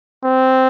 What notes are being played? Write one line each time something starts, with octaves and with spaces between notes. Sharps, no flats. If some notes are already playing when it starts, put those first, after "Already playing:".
C4